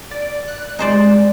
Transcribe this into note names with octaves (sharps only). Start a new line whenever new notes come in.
D5
F#6
G#3 D#4 C5 D5